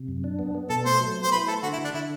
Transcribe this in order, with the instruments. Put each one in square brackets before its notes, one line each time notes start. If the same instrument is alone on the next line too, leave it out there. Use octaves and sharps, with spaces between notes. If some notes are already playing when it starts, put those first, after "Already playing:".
Already playing: [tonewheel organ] C3
F#2
D4
B3
B3
[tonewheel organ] B2 [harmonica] A4
[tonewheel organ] A3 [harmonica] C5
[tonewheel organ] F#3
B3
[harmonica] C5
[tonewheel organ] E4 [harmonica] B4
[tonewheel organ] A3 [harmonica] A4
[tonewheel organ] D3 [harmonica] F#4
[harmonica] E4
[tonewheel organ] D3
[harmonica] D4
[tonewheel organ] D3 [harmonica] E4